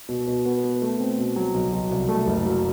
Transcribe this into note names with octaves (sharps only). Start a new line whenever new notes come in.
B2
B2
B3
B3
A3
C4
B2
F#3
B1
B1
C2
A3
F#1
F#3